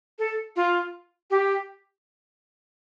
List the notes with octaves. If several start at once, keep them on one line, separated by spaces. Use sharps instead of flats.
A4
F4
G4